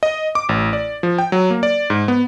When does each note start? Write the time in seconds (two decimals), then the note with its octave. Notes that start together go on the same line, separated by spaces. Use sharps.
0.03 D#5
0.35 D6
0.49 A1
0.73 D5
1.03 F3
1.18 G5
1.32 F#3
1.50 A#3
1.63 D5
1.90 G#2
2.08 B3